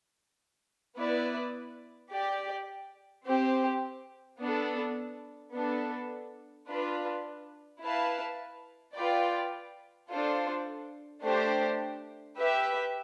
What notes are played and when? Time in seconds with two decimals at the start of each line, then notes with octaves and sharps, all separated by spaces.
0.96 B3 E4 B4 D5
2.11 G4 D5 G5
3.25 C4 G4 C5
4.39 B3 D4 A4
5.53 B3 D4 A4
6.68 D4 F4 B4
7.81 E4 B4 F5 A5
8.95 F4 B4 D5 G5
10.09 D4 F4 A4 C5
11.23 A3 D4 G4 C5
12.37 G4 B4 E5